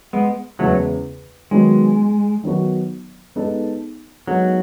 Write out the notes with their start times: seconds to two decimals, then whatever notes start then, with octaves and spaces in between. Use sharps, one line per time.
0.13 G#3 B3
0.59 E2 C#3 F#3 G#3 A3
1.51 D#3 F#3 G#3 B3 F#4
2.43 D#3 F#3 B3 F#4
3.36 G#3 B3 D#4 A4
4.27 F#3 G#3 B3 D#4 A4